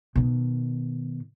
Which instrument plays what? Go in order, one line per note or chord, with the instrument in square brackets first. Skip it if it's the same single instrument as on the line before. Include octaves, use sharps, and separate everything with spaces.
[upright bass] B2 D#3